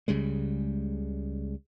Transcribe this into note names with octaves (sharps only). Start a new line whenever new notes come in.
C#2 C#3 G3 G#3